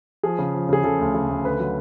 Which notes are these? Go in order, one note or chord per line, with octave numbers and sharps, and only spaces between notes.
F3 G#4
C#3
F3
C#3 G#4
C#3 A4
D2
C#3
D2
D3 B4
F#3